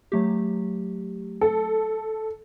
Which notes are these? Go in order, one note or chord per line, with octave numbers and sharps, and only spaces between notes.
F#3 A3 G4
A4